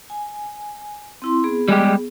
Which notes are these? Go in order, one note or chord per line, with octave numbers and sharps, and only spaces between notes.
G#5
C4 E4 C6
B3 G#4
G3 G#3 G4